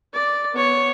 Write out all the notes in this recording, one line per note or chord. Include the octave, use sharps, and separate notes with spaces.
D5
B3 C#5